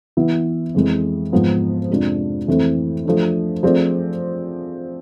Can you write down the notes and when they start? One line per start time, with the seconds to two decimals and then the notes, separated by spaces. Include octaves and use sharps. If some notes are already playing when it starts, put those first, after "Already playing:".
0.17 E3 B3 E4
0.74 F2 E3 G#3
1.32 G#2 F3 B3
1.90 F2 C3 G#3 D4 F4
2.47 F2 E3 A3 C4 E4
3.05 F3 A3 D4
3.63 F3 A3 C4 G#4 D5